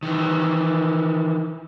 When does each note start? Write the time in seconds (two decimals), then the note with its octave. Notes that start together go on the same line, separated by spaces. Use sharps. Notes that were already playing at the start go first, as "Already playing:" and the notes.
0.03 D#3 E3